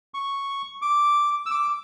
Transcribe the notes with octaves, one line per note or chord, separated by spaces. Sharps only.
C#6
D6
E6
D6